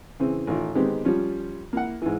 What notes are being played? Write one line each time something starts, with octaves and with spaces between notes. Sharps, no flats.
C#3 E3 C4
A1 D#3 F4
D#3 G#3 B3 C4 G4
F3 G3 C#4 F4
A#3 E4 F#5
G#2 E3